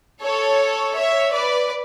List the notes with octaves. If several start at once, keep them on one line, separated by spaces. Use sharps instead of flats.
A4 C#5
C#5 E5
B4 D5